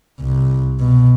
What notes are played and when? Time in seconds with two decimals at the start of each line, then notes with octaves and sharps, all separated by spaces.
0.20 C2
0.80 B2